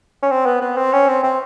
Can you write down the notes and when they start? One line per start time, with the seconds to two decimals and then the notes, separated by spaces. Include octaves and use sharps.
0.22 C#4
0.31 C4
0.46 B3
0.61 B3
0.77 C4
0.93 C#4
1.08 C4
1.23 C4